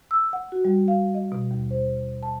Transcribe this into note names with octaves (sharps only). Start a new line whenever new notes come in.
E6
F#5
F#4
G3
F5
D#5
B2
D#2
C5
A5